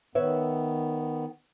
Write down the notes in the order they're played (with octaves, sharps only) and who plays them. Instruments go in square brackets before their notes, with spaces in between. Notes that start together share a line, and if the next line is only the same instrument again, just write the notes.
[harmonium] D#3 B3 [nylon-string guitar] B4 C#5 E5